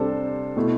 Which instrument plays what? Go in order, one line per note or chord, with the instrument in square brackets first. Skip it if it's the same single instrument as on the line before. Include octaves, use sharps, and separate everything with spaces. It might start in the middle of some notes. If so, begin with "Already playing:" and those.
Already playing: [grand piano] C3 G3 D4 A4 C5
B2 A3 E4